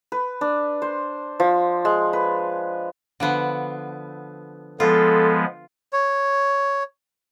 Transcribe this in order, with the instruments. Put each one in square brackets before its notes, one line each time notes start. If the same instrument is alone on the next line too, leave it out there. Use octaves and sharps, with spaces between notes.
[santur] B4
D4
C5
F3
G#3
B4
[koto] D3 F3 B3
[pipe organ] F3 G#3 B3 [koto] F4 [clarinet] A4
[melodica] C#5